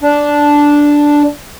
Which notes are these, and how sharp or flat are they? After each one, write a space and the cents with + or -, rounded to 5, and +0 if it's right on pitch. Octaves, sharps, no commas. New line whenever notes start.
D4 -5